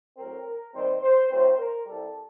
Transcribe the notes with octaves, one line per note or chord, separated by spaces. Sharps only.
A2 F#3 C4 A#4
D#2 D#3 G3 C4 C5
C5
A2 F#3 C4 C5
A#4
C2 C3 G3 A4